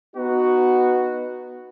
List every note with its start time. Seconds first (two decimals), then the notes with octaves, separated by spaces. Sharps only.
0.17 B3 D#4 F#4